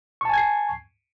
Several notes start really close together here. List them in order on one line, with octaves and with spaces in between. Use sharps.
C#6 A5 G#5 G#6 C7